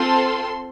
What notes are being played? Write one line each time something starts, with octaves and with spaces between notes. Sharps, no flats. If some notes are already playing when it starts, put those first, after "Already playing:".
Already playing: C4 F4 A4 C6